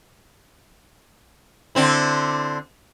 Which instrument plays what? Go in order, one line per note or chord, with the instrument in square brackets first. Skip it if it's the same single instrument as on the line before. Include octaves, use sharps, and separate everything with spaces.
[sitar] D3 C4 E4